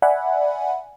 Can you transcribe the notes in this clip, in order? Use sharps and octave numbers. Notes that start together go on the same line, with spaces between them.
D5 E5 F#5 G#5 B5